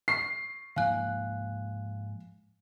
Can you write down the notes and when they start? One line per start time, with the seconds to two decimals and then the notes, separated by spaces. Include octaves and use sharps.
0.08 C#6 C7
0.76 G#2 F3 A#3 F5 G#5 F#6